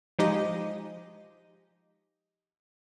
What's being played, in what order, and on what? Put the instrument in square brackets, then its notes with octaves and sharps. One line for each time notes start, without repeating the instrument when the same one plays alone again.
[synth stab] F3 G#3 D#4 G4 D#5